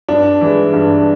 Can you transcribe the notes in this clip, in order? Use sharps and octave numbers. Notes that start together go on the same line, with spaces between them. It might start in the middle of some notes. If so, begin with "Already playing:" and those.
G2 D4
E3 G#3
G2